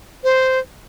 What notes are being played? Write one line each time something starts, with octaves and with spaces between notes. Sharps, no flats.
C5